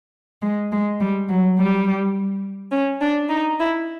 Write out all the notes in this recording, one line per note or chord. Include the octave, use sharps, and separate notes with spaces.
G#3
G#3
G3
F#3
G3
C#4
D4
D#4
E4